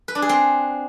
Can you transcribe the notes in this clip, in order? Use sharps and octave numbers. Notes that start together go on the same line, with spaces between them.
B4
D4
G#4
C4